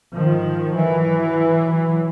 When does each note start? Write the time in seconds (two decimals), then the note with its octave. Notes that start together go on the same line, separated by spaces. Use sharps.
0.14 G#2 D#3 F3
0.76 E3 F#3